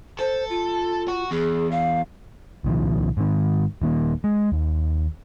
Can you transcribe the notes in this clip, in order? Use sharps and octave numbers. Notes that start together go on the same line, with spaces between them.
A4 C5
F4
F#4
E2 G#4
F5
C2 A#2 D#3 F3
G#2 D#3
D#1 D#3 A#3
G#3
D#2